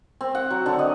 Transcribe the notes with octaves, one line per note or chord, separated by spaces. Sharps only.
C4
F#5
F#3
D3
D#5